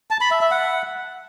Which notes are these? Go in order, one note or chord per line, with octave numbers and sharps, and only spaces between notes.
A5
B5
E5
E5
F#5